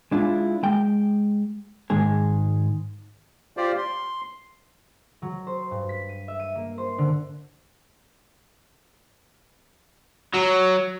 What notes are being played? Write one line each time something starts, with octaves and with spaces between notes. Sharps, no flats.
G#3 D4 E4 F4
G#3 G5
G#2 D#3 G#3 G#4
F4 G4 C5 D5
C6
F#3
C5
G2
B6
D#7
E5
D#7
A#3
C5
D3
F#3